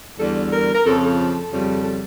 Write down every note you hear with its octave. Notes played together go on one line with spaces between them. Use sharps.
E2 D3 G3 A4
A#4
A#4
F2 C#3 F3 A4
A4
F2 C#3 G3
A4